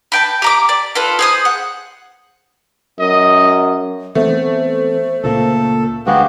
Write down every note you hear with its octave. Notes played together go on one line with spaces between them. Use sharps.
B4 G5 A5
G4 A#5 D6
D5
F4 A4 B4
G#4 C5 D#6
F#5
F#2 D#5
E3 A3 B3 C4 C5
C#2 A#2 A#3 A4
D2 G#3 B3 F#4 G4 F5